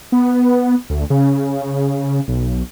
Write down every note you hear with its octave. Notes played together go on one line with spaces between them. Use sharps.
B3
D2
C#3
B1